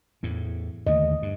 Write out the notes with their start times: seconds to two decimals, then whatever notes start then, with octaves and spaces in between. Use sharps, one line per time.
0.23 E2 A2
0.87 D#2 D3 A3 D#5
1.22 G2